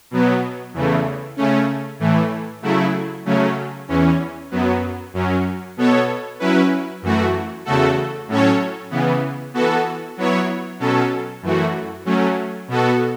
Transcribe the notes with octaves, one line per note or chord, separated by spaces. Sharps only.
B2 F#3 B3
E2 C#3 E3 A3
C#3 A3 C#4
A2 E3 A3
C#3 F#3 A3 E4
C#3 F#3 A3 C#4
E2 E3 C#4
F#2 F#3 B3
F#2 F#3 C#4
B2 B3 A4 C#5
F#3 C#4 E4 B4
F#2 E3 A3 F#4
E2 C#3 A3 F#4 A4
A2 F#3 C#4 A4 C#5
C#3 E3 B3
E3 B3 F#4 A4
F#3 B3 E4 C#5
B2 F#3 C#4 A4
F#2 E3 A3 F#4
F#3 A3 C#4
B2 B3 F#4 A4